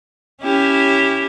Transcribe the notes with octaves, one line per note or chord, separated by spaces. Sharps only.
C#4 E4 G4